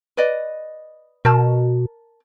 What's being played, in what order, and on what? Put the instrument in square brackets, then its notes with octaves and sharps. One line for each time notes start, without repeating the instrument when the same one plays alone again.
[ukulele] B4 D5 D#5
[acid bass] B2 [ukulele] A#4 A5